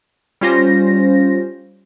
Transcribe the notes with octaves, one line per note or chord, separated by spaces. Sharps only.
G3 C#4 F4 C5 A#6